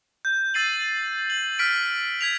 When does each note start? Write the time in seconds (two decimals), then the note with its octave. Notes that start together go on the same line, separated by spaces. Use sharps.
0.25 G6
0.54 E6 A6 C7 D#7 F#7
1.30 F#7
1.59 F6 B6 D7
2.21 G#6 B6 F7